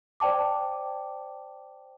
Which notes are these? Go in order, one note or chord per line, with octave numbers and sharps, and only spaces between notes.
C5 D5 G5 A5 D6